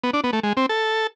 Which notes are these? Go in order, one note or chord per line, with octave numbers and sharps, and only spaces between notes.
B3
D4
B3
A3
G#3
C4
A4